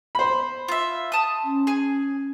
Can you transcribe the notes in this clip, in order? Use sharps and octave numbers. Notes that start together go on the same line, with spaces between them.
C5 B5
F4 E5
A5 D#6
C#4
G#4 G#5